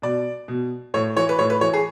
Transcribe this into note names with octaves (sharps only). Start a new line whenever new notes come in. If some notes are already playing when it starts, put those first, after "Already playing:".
B2 D5
B2
A2 C#5
E3 C#5
B4
A2 C#5
B4
E3 C#5
G#4